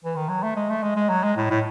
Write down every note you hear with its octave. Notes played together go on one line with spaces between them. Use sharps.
E3
D#3
F#3
A3
G#3
A3
G#3
G#3
F#3
G#3
A2
A2